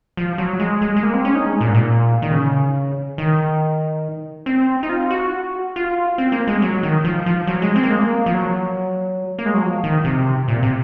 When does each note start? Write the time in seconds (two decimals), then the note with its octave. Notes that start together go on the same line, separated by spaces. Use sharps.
0.17 F3
0.38 F#3
0.60 G#3
0.82 G#3
0.96 G#3
1.03 A#3
1.13 C4
1.25 C#4
1.35 D#4
1.45 G#3
1.61 A#2
1.68 G#2
1.75 A#2
2.22 D#3
2.32 C#3
3.18 D#3
4.46 C4
4.83 D#4
4.89 F4
5.11 F#4
5.76 F4
6.18 C4
6.32 A#3
6.47 G#3
6.62 F#3
6.83 D#3
7.04 F3
7.26 F3
7.47 F#3
7.62 G#3
7.76 C4
7.83 A#3
7.91 G#3
7.99 A#3
8.26 F3
8.34 F#3
9.39 A#3
9.46 G#3
9.54 F#3
9.62 F3
9.84 D#3
10.05 C3
10.48 A#2
10.63 C3